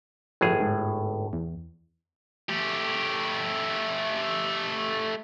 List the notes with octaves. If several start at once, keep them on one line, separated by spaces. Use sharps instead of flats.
G1 A2 F3 G#4
G#2
E2
A3 G4